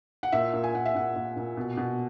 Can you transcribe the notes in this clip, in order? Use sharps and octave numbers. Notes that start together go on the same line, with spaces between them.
F#5
A#2 E5
A#2
G#5
A#2 F#5
E5
A#2 F#5
A#2
A#2
B2
B2